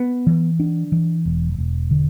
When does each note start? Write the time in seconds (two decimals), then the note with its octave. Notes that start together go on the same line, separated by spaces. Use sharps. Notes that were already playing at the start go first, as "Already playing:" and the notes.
Already playing: B3
0.27 E3
0.60 D4
0.92 E3
1.25 E1
1.58 E1
1.91 D3